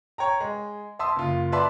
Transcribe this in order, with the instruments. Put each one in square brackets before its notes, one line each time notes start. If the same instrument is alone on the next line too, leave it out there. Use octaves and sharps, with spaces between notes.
[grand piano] C#5 G5 A#5
G#3
E5 A5 C6 D#6 E6
F#1 F4
B4 D5 E5 A5 C6